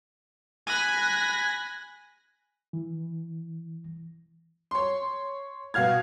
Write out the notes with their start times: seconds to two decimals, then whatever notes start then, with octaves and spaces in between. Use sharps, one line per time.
0.67 G#5 B5 F#6 A#6
2.73 E3
4.71 C#5 C6
5.74 B2 F#4 F5 F6 G#6